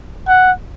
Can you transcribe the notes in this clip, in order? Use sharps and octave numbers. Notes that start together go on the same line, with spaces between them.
F#5